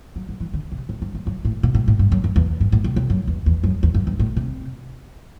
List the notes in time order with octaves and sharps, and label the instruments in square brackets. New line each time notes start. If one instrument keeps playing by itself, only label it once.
[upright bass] F#3
F#3
E3
D3
C3
A2
G2
F#2
F#2
A2
B2
A2
A2
G2
F#2
F#2
E2
G2
A2
C3
C3
F#2
E2
E2
F#2
E2
F#2
G2
A2
C3